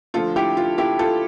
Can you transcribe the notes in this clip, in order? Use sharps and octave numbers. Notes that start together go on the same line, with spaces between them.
D3 F3 A3 F4 A4
E4 G4
F4
E4 G4
F4 A4